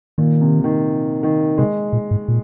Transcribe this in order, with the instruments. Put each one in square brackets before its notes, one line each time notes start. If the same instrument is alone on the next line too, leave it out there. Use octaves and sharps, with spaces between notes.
[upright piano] A#2 [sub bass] D#3
[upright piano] C3
D#3
D#3
[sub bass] C3 [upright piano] G#3
[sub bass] A#2
G#2
A#2